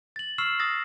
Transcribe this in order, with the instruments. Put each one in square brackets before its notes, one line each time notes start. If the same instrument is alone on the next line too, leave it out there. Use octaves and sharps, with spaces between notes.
[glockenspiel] A6 F#7
C#6 E6 F6 C7 E7 F#7
D#6 E6 A6 A#6